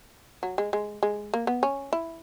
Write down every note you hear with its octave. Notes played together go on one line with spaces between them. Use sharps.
F#3
G#3
G#3
G#3
A#3
B3
C#4
E4